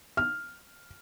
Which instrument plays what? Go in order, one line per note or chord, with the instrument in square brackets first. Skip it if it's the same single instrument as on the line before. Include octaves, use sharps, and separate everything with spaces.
[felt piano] F6